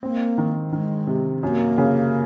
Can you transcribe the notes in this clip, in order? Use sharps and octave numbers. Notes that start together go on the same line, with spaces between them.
A#3 C4
D#3
D#3 G#3
C3
F#2 A#3
C#3